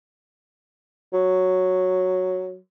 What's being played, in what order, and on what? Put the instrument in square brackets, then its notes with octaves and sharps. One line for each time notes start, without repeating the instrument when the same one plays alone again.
[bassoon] F#3